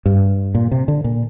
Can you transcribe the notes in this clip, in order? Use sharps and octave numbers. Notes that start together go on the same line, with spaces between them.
G2
A#2
C3
D3
A#2